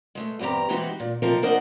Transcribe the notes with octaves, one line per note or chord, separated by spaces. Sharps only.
G#3 A3
E2 G2 C4 G4 A#5
E3 G#3 C4 D#4 F#4 G4
A#2
C3 F3 C4 D#4 A4 A#4
D4 A#4 C5 D#5 F#5